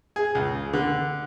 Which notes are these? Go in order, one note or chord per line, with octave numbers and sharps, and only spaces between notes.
G#4
C#2
D3